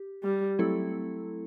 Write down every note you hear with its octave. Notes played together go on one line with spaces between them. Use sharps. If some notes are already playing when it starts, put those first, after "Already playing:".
Already playing: G4
G3
F#3 A3 C4 E4 A4